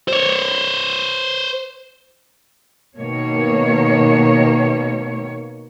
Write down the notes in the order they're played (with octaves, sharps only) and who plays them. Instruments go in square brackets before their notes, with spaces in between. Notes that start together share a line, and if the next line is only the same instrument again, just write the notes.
[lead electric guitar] C5 C#5
[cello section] B2 D#3 A#3 C#5